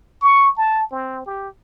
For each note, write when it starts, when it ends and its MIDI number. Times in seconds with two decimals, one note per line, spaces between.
0.21 0.53 85
0.57 0.84 81
0.91 1.22 60
1.26 1.48 67